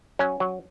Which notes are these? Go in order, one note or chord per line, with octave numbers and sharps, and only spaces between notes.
F#3 C#4
F#3